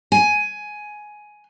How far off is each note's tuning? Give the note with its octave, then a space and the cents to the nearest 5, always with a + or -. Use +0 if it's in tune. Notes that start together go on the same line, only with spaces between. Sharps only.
G#5 +10